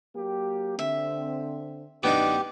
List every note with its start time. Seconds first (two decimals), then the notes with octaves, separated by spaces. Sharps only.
0.15 F#3 A#3 G4
0.79 D3 C4 E5
2.03 F#2 D3 B3 D4 D#4 G4